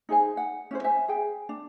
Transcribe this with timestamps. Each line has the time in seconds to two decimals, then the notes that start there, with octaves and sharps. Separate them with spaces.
0.09 D#4 G#4 C5 G#5
0.37 F#5
0.71 C#4 E4 C5
0.84 C5 E5 G#5
1.08 G#4 G5
1.49 D4